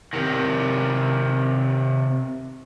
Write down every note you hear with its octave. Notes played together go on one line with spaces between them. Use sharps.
C3 D#3